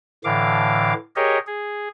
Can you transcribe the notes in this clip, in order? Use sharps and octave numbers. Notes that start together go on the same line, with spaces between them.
A2 D3 E3 F5 D6
G4 G#4 A#4 C#5 D#5
G#4